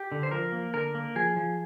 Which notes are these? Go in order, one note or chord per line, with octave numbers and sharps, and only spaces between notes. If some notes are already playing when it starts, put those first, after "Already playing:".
Already playing: G4
D3
C5
F3 A#4
A#3
D3 A#4
A#3
F3 G#4
F3